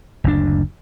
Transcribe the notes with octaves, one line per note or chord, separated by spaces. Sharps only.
F#1 D2 D4